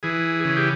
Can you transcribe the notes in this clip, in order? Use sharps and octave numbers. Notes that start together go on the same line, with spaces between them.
E3 G#4
C#3 G#4
G4